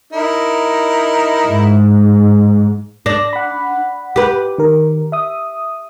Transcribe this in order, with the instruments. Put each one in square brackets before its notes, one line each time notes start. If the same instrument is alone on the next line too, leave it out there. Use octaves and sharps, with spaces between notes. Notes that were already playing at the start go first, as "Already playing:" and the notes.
[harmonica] D#4 E4 A#4
[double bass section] G#2
[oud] D4 [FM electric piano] A#6
[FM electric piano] F#5 B5
[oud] G4 B4
[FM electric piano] D#3 A#4
E5 D#6